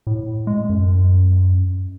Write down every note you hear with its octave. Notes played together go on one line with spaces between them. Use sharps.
A2
G#3
F#2